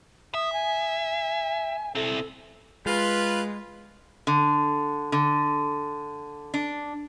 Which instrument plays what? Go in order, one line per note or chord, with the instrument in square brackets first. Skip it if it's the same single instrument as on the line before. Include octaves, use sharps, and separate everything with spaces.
[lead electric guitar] E5 [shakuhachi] D#6
[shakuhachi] G#5
[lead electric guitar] C4 E4 [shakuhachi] A4
[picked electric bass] G#3 [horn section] F4 B4
[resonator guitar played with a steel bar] D3
D3
D4